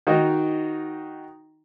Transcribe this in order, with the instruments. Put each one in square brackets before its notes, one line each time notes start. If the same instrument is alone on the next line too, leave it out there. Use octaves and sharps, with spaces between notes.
[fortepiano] D#3 D#4 F#4